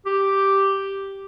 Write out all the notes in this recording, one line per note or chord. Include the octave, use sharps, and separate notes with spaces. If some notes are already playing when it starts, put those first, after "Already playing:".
G4